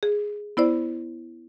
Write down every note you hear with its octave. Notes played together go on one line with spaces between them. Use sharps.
G#4
B3 E4 C5 D5